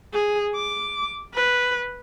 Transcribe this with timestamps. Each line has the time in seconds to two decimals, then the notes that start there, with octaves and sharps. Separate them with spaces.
0.13 G#4
0.55 D6
1.34 B4